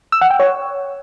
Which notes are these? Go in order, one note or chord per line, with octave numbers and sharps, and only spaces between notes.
E6
F#5
G5
C#5